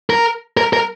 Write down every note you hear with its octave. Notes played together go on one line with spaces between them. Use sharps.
A#4
A#4
A#4